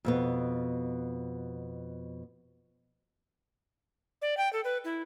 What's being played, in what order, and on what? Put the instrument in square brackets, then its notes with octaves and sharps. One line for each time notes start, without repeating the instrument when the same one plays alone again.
[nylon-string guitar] F2 B2 B3
[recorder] D5
G5
A4
B4
E4